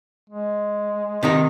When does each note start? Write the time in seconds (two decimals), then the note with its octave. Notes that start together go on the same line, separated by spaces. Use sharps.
0.30 G#3
1.23 C3 D#3 D#4